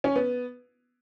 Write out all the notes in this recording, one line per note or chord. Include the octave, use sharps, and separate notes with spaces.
C#4
B3